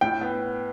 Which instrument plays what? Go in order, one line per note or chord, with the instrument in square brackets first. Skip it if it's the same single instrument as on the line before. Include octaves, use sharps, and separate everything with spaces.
[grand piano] A2 [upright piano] G5
[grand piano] B3